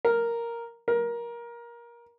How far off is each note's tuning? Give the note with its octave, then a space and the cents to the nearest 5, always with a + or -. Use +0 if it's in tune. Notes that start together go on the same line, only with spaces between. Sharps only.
A#4 +0
A#4 +20